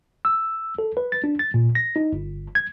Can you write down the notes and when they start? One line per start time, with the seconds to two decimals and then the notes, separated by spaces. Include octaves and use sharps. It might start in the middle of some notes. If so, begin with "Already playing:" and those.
0.25 E6
0.78 A4
0.97 B4
1.12 A6
1.24 D4
1.39 A6
1.54 A#2
1.75 A#6
1.96 D#4
2.13 G1
2.55 G#6